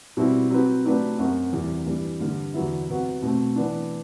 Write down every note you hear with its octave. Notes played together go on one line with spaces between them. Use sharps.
B2 G3 C4 E4
F#3 C4 G4 B4
F#3 A3 D4 G4 B4
F#2 F#3 C4 F#4
E2 C3 G3
G2 E3 G3
G2 D3 G3
E2 D3 F#3 B3 E4
C3 F#3 B3 F#4
B2 A3 C4
E3 B3 D4